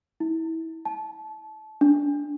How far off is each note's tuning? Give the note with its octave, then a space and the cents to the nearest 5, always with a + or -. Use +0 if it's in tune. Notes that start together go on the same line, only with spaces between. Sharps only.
E4 -25
A5 -25
D4 -20